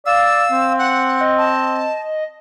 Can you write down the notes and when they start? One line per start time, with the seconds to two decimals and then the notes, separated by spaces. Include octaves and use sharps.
0.06 D5 F5 E6
0.51 C4
0.79 F#5 F#6
1.21 D#5
1.38 A5